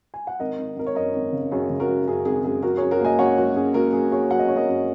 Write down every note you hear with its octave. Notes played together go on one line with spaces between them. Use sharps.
G#5
F#5
G#1 A#4 D#5
G#1
G#1 A#4
C#5
F#2 A#4 D#5
G#1
C#3
F#2 G#4 C#5
C#3
F#4 A#4
F#2
F#2 G#4
G#1 G#4
F#2 G#4
F#3 F#4 A#4
G#4 C#5
F#2
F#4 A#4
A#3 D#5 G#5
F#2 C#5 F#5
F#2 F#4
C#4 G#4
A#3 F#4 A#4
F#3 G#4
F#3 G#4 C#5
F#3 F#5
D#5
C#4 C#5
A#4 D#5
F#2